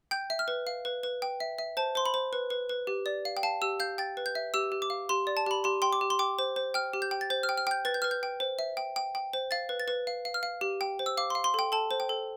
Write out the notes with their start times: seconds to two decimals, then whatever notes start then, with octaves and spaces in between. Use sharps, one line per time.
0.11 G5 G6
0.30 E5
0.39 F6
0.48 B4
0.67 F5
0.85 B4
1.03 B4
1.22 G5
1.40 E5
1.58 E5
1.77 C5 A5
1.95 C5 C6
2.06 B5
2.14 C5
2.33 B4
2.50 B4
2.69 B4
2.87 G4
3.06 D5
3.25 F5
3.37 G5
3.43 F5 A5
3.62 G4 E6
3.80 F5 G6
3.98 G5 A6
4.17 B4
4.26 G6
4.35 E5
4.54 G4 E6
4.72 G4
4.82 D6
4.90 F5
5.09 G4 C6
5.27 D5
5.37 A5
5.46 G4 B5
5.64 G4 C6
5.82 G5 C6
5.93 D6
6.01 G4
6.10 C6
6.19 G5 D6
6.39 C5
6.56 C5
6.74 G5 F6
6.93 G4
7.02 G6
7.11 G5
7.21 A6
7.30 C5 G6
7.43 F6
7.49 G5
7.58 F6
7.67 G5 G6
7.85 B4 A6
7.94 G6
8.02 B4 F6
8.11 G6
8.23 G5
8.40 C5
8.59 E5
8.77 G5
8.96 G5
9.15 G5
9.33 C5
9.51 F5 A6
9.69 B4
9.80 A6
9.88 B4
10.07 F5
10.25 F5
10.34 F6
10.43 F5
10.61 G4
10.81 G5
10.99 C5
11.06 E6
11.17 F5 D6
11.30 C6
11.35 F5
11.44 C6
11.54 A4 G5
11.72 A4 A5
11.91 C5
12.00 G5
12.09 A4